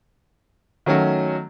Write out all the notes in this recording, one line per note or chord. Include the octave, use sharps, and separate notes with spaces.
D#3 F#3 A3 C#4 F#4